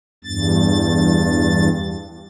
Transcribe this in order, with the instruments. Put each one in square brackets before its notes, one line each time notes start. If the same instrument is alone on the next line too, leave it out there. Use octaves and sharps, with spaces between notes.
[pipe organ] E2 G2 A6